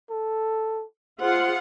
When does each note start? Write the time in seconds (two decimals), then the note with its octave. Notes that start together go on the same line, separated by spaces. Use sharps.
0.10 A4
1.21 F4 G#4 C5 F#5